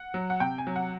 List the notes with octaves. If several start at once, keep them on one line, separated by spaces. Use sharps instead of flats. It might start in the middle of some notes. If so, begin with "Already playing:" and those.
Already playing: F#5
F#3
F#5
C3 G5
G#5
F#3
F#5